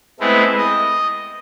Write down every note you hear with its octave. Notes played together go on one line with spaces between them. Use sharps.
G#3 A3 B3 C4 E4
D#5